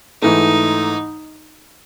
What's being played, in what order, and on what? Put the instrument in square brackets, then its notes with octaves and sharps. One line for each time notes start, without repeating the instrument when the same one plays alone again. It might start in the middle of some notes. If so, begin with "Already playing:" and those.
[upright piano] G#2 E3 A3 [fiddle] D#4